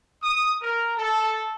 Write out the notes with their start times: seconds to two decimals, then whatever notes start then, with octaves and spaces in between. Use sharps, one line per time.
0.23 D#6
0.62 A#4
0.97 A4